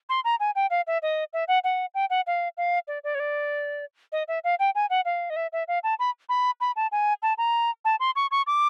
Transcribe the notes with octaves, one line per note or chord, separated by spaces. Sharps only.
C6
A#5
G#5
G5
F5
E5
D#5
E5
F#5
F#5
G5
F#5
F5
F5
D5
D5
C#5
D5
D#5
E5
F5
G5
G#5
F#5
F5
D#5
E5
E5
F5
A5
B5
B5
B5
A5
G#5
A5
A#5
A5
C6
C#6
C#6
D6